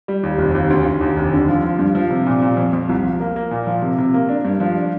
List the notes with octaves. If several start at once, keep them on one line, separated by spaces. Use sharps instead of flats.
G3
D#2
F1
D#2
D2
D2
D#2
F1
D3
F3
F3
G2
F3
C3
A#2
A#2
F2
F2
C2
F3
A#3
A#3
A#2
F3
C3
C3
A#3
D4
G2
F3
D4